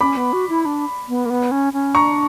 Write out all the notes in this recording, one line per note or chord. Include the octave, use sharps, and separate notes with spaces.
C#4 B5 D6
B3
F#4
E4
D4
B3
A#3
B3
C#4
C#4
D4 A#5 C#6